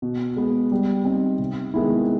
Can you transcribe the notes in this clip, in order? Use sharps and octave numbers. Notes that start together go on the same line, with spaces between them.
B2
G#3 B3
G3
C4 D#4
C3
D#3 G#3 B3 E4